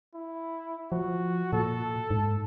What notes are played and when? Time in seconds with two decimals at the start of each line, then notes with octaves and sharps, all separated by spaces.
0.14 E4
0.92 F3 F#4
1.53 A#2 A4
2.10 G#2